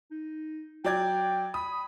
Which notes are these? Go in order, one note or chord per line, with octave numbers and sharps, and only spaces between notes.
D#4
F#3 D5 G5 G#6
B5 D#6